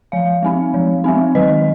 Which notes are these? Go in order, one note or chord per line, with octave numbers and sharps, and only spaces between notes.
F3 F5
G#3 C4 D#4
F3
G#3 C4 D#4
D#3 D#5